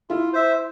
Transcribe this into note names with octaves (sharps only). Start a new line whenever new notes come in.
E4 F4
C5 E5